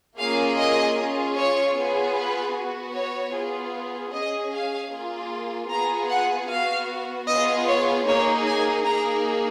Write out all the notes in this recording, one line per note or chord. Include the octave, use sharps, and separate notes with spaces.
A#3 C#4 F4 G#4 F5
D#5
C#4 F4 G#4
C#5
B3 F4 G#4
B4
B3 F#4
C#5
B3 F4 G#4
C#4 G#4 D#5
F5
A#3 F4 G#4
B3 F4 G#4 A#5
F#5
B3 F#4 F5
B3 F4 G#4 D#5
C#5
A#3 D#4 G#4 C#5
G#5
A#3 D#4 G#4 A#5